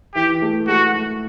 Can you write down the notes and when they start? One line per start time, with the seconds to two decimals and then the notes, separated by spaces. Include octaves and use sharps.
0.15 E3 G4
0.42 A3
0.67 A3 F#4
0.94 A3